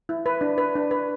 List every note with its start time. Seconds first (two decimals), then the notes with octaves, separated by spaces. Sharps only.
0.09 E4
0.26 B4
0.41 D4
0.58 B4
0.75 D4
0.91 B4